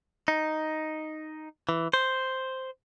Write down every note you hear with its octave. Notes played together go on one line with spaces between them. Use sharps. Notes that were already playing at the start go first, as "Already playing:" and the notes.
D#4
E3
C5